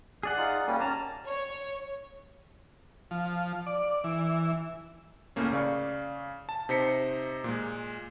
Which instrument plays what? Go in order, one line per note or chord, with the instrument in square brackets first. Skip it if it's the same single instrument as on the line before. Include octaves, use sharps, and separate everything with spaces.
[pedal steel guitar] G#4 D5 F#5
[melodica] D#4 F4
G3 A#3 C#4
[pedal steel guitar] C#4 [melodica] A5 A#5
[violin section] C#5
[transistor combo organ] F3
D5
E3
[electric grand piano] C#2 A2 A3 A#3 C#4
C#3 D5 F5 C#6
A5
C3 D#4 C5 B6 C#7
A#2 G#3